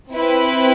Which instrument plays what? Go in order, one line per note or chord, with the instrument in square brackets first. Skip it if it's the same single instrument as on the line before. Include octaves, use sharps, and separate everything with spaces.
[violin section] C4 E4 B4